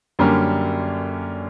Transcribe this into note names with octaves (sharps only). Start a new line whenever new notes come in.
F#2 D3 G3 A#3 C#4